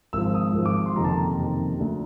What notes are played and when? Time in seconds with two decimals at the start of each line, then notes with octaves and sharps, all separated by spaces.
0.13 G#1 G#2 F3 E6
0.34 D#6
0.54 G#1 G#2 F3
0.66 D6
0.86 C6
0.96 F#1 F2 C3 D#3 A#5
1.04 A5
1.12 A#5
1.38 F#1 F2 C3 D#3
1.79 D2 D3